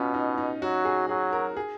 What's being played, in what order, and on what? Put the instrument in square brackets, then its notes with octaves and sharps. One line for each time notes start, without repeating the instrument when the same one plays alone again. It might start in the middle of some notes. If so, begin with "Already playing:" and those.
Already playing: [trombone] B2 [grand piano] C#4 F4
[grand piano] D#4
D#4
[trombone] F#3 [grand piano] F#4
[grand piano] G#4
[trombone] F#3 [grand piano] G#4
[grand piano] A#4
G#4